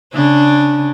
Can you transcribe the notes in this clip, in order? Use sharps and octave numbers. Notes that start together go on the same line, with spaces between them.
C#3 D4